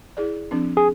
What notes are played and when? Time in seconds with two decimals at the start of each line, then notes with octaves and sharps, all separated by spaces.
0.17 E4 G#4 D5
0.51 F3 C4 D4
0.77 G#4